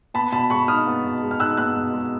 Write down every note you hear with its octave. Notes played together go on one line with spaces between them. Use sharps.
B3 A5 B5
B2 A5 B5
G#3 B5 C#6
D#4 D#6 F6
B3
B2
G#3
F6
D#4 E6 F#6
B3 E6 F#6
B2
G#3